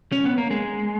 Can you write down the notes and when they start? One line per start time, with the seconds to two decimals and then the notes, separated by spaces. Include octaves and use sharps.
0.12 C#4
0.25 B3
0.38 A#3
0.51 G#3